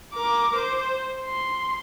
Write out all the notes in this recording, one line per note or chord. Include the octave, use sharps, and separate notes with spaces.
A#4 D6
C5
C6